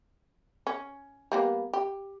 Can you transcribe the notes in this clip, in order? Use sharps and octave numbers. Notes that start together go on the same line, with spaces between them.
C#4
G3 A#3 B3
G4